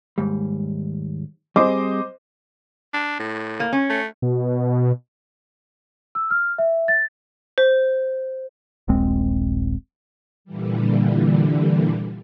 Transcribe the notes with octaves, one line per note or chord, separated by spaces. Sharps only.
D#2 G#2 G3
G3 C4 G#4 C5 D#5 D6
D4
A2
A#3
C#4
A3
B2
E6
F6
E5
A6
C5
D#1 A#1 G#3 C4
A#2 D3 E3 G3